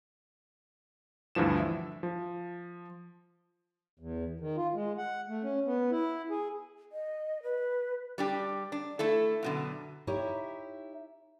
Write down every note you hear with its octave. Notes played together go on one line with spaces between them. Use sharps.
D2 G2 E3 F3 E7
E5
F3
E2
D#3
F4
G#3
F#5
A3
C#4
B3
E4
G#4
D#5
B4
G3 D4 G4
D4
A3 E4 A4
F#2 B2 D3
D#4 E4 G4 C#5 E5